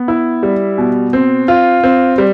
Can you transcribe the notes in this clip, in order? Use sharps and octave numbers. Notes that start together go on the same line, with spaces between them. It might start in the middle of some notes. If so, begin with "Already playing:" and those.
Already playing: B3
E4
G3
B2
C4
F4
C4
G3